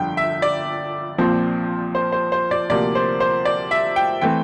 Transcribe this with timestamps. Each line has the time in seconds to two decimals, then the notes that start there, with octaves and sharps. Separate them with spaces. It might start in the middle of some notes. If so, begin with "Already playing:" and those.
Already playing: G1 F2 D3 G5
0.17 E5
0.42 D5
1.18 A#1 A#2 F3 C4
1.95 C5
2.12 C5
2.32 C5
2.51 D5
2.69 D2 C3 F3 A#3 D5
2.95 C5
3.20 C5
3.45 D5
3.71 E5
3.96 G5
4.21 E3 A3 C4 G5